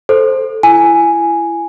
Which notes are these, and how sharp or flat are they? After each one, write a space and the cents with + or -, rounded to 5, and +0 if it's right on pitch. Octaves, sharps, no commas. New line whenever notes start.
A4 +0 C5 +5
E4 +30 G#5 +0